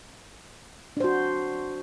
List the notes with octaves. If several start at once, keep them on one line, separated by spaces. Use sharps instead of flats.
D4 F#4 C5